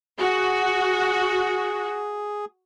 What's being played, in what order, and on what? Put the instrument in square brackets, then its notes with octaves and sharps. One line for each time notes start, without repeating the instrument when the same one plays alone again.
[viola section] F#4 [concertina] G#4